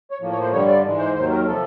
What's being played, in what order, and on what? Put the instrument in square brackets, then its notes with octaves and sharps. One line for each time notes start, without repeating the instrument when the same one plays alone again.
[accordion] C#5
A2 F3 A#3
C#5
C5
G2 D3 G3 C#5
D5
G#2 E3 G#3
C5
D#2 D#3 F#3 C5
A#4
C3 F3 A4